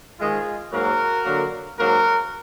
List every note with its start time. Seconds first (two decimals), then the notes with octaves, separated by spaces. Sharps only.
0.19 G#2 D#3 G#3 F4 G#4
0.72 G#2 F#3 A#3 F#4 A#4
1.25 D3 F#3 A#3
1.78 G#2 F#3 A#3 F#4 A#4